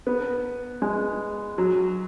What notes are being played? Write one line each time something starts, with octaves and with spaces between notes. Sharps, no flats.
B3
G#3
F#3